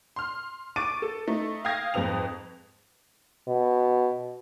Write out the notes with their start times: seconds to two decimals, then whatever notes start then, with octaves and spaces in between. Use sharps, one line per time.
0.16 C6 F6
0.76 C#6 D6 A6 D7 D#7
1.02 A4
1.28 A3 D#4
1.65 F5 G5 D#6 G#6 A#6
1.94 F2 G#2 C4 B4 D#6 F7
3.48 B2